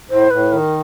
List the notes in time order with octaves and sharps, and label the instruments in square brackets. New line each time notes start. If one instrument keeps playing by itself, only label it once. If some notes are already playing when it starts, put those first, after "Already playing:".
[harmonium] A2 [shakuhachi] C5
[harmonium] A2 [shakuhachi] B4
[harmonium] D#3 [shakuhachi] A#4